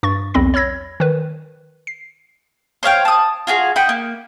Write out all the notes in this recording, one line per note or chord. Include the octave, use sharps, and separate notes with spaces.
G2 C#6 A6
B1 E2 C4 B5 A#6
C#5 B5 E6 G#6 A#6
D#3 B4
C7
C5 C#5 F5 G5
A5 D#6
F4 F#4 G#4 F5
D#4 F#5 G5 B5
A#3